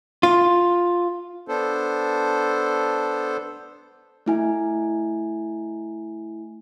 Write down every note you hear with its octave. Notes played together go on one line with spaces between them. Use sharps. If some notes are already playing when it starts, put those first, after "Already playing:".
F4
B3 D4 A4 C5
A3 E4 G#5